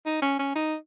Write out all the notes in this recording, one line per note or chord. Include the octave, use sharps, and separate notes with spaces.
D#4
C#4
C#4
D#4